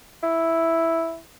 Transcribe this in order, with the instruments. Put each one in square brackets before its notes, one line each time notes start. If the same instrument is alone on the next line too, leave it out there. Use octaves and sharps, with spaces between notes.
[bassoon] E4